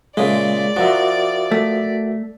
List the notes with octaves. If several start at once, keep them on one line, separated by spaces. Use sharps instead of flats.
A#2 C#3 G#3 A3 D5
F3 F#4 A#4 E5
A3